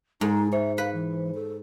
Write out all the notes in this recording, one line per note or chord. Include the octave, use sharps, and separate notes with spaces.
G#2 G#3 D#4
C5 E5
B4 F5
E3
A4